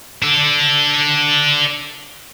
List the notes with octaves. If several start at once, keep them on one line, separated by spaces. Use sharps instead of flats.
D4 A4